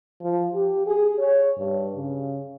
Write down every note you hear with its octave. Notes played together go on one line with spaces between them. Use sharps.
F3
G4
G#4
C#5
G2
C#3